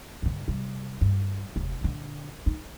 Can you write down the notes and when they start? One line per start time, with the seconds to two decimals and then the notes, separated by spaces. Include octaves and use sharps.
0.22 G2 D3
0.48 C3 G3
1.01 G2
1.56 F1 D#2
1.81 A#2 D3
2.46 D#3 D#4